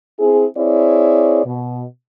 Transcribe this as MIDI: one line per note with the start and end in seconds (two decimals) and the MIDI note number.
0.19 0.46 60
0.19 0.46 64
0.19 0.46 68
0.57 1.44 60
0.57 1.44 64
0.57 1.44 68
0.57 1.44 73
0.57 1.44 74
1.45 1.84 47